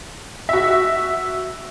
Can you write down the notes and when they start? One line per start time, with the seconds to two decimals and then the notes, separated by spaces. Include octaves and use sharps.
0.49 F#4 E5